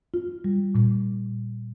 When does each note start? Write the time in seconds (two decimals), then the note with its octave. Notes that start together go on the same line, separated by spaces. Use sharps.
0.14 F4
0.44 G3
0.75 A#2